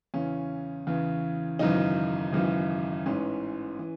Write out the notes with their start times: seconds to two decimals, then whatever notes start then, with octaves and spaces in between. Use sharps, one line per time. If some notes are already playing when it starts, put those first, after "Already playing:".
0.14 E2 C#3 E3 C#4
0.87 E2 C#3 E3
1.59 G#1 F#2 C#3 E3 D#4
2.33 G#1 F#2 C#3 E3
3.06 A1 G#2 E3 C#4
3.79 E3